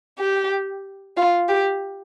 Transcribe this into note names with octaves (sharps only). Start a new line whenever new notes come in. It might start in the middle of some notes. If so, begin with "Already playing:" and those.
G4
F4
G4